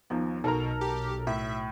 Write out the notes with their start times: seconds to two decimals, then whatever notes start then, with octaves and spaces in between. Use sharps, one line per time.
0.10 D#2 F3 B3 A#5
0.44 B1 B2 D#4 A4 A#4 A#5
0.81 G4
1.27 A2 E5